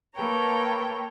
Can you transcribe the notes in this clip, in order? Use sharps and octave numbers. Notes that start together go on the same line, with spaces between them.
A#3 A4 B4 C#5 G5 A#5